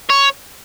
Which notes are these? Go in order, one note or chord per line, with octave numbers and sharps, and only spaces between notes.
C#5